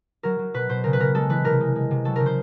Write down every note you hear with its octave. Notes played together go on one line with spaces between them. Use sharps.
F#3 A#4
F#3
B2 B4
B2 C5
C#3 A#4
B4
C#3 A#4
G#3 A4
E3 B4
C3 A#4
G#3
G#3
C3
F#3 A4
C#3 A#4
C5